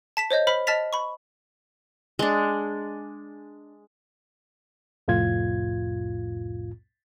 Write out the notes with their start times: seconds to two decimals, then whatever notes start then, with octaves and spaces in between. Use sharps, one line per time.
0.17 A5 B6 E7
0.31 C5 C#5 D#5 G6
0.47 C5 B5 F6 B6
0.67 D#5 A5 F6 A6 B6 F7
0.93 B5 C#6
2.19 G#3 D4
5.08 C2 F2 A2 F4 G#6